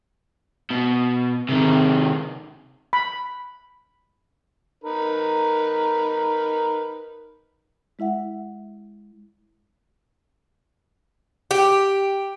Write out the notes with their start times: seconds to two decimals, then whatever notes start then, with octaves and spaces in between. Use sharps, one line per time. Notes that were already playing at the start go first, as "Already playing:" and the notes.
0.70 B2
1.49 C3 D#3
2.93 B5
4.84 D#4 A#4 B4
7.99 G#3 E4 E5 F#5
11.51 G4